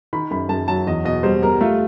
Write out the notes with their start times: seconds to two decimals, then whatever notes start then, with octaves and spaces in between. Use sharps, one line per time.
0.13 D#3 B5
0.31 F#2 B5
0.49 F#2 A5
0.68 F#3 A5
0.87 E2 D#5
1.05 B2 D#5
1.23 G3 C5
1.43 G3 A#4
1.61 A3 F4